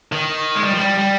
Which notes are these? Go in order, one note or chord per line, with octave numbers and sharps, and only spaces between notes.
D#3
G#3
G3
F3
G3
G3